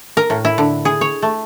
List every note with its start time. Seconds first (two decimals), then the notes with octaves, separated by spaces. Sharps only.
0.17 A#4
0.30 A2
0.45 E4
0.58 D3
0.85 G#4
1.01 C#5
1.22 A3